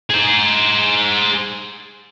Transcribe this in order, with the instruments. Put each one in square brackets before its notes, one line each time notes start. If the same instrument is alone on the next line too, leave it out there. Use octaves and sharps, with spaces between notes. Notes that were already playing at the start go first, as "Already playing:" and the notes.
[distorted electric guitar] G#4 C5